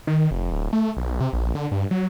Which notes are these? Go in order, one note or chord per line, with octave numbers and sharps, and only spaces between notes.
D#3
F1
D1
A3
B1
C3
A#1
D3
G2
F#3